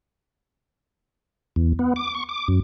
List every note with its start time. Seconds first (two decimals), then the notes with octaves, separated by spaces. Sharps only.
1.56 E2
1.79 B3
1.96 D6
2.15 C#6
2.29 D6
2.48 F#2